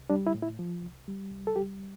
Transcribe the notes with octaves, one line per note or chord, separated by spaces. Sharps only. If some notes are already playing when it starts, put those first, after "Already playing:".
Already playing: C2
G3 D4
E4
A2
E4
F3
C2
G3
C2
A4
G3 G4